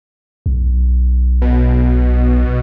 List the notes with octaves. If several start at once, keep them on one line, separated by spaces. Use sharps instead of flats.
B1
B2